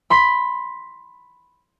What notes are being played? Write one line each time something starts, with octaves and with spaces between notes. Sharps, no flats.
B5 C6 B6